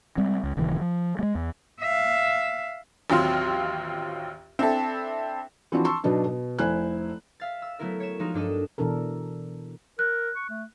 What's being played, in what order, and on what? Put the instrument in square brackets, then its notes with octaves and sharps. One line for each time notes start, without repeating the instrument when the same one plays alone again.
[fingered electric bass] G3 G#3 C4
C#2
D#1 D#2 C#3 E3
F3
G#3 A3
E2
[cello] E5 F5
[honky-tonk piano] A1 D#2 F#3 C4 F4 C6
C4 D4 E4 A4
[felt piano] E3 F3 C4 D4 E4 F#4
A5 C6 C#6 E6
B2 F#3 B3 D4 D#4
B2
F1 E4 C5 G#5 F#6
[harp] E5 F5 A6
E6
F#3 A3 B3 E4 A#4 E5
C#5 E7
F3 G#3 D#4 F#4 A#4
G2 D4 A4 D#5
[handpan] B2 E3 D4 A4 A#4
[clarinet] A#4 [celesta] F#6
[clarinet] C#6
A3